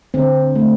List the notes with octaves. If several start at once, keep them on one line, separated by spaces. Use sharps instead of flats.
D3 C4
A3